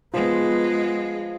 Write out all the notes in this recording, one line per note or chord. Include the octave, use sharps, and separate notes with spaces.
F3 G#3 B3 F4 G#4 C6